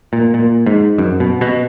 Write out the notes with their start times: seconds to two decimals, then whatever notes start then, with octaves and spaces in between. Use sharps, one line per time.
0.13 A#2
0.34 A#2
0.67 G#2
0.98 F#2
1.20 B2
1.41 B2